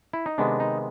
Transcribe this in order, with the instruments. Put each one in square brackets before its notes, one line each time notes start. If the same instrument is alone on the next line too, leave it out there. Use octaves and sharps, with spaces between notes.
[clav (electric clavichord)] E4
D#4
C3 D#3 G#3 B3 D4
D#4